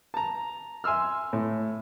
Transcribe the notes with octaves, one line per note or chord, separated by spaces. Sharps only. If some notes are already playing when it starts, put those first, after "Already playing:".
A5 A#5
E5 G#5 C6 E6 F6
A2